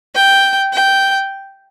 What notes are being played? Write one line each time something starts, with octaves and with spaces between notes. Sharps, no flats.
G5
G5